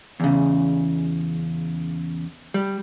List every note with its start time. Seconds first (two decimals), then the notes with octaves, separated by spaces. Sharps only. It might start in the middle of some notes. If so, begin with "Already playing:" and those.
0.20 E2 C#3
2.54 G3